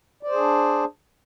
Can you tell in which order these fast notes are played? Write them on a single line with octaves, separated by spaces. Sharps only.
D5 C5 G#4 D4